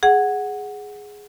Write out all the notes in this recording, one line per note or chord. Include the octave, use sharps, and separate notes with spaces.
G#4 F#5